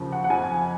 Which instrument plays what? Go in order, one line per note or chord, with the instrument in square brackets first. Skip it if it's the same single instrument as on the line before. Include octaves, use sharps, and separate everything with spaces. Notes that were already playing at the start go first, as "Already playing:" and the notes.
Already playing: [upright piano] D#2 C#3 F3
F#5
F#5
F2 F3 G#5